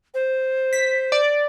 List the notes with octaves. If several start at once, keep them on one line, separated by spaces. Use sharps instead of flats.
C5
B6
D5